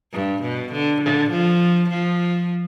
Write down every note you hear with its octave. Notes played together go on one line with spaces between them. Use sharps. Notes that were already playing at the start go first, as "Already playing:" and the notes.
G2
B2
D3
D3
F3
F3